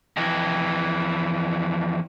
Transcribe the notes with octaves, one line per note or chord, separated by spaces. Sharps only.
F2 E3